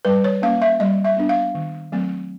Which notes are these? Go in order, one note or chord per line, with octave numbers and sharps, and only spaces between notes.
G3 B4
C#5
A#3 C#4 F5
E5
G3 D#5
E5
B3 D4
F5
D#3
F#3 A3 C4